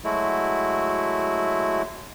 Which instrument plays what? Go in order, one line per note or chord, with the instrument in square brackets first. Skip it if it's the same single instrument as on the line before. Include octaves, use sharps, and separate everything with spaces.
[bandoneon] F#3 G#3 A3 E4 F#4